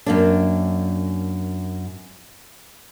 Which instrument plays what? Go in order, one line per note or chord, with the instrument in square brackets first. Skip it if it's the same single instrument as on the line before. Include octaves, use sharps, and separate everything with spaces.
[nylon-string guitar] F#2 A#3 D4